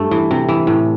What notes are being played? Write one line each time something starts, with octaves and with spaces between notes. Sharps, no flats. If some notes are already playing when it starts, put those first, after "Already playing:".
Already playing: G2 A3
E3
C3
E3
A2